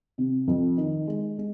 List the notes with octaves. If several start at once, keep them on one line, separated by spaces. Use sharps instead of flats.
C3
F2
D#3
G#3
G#3